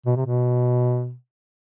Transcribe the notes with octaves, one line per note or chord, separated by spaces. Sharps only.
B2
C3
B2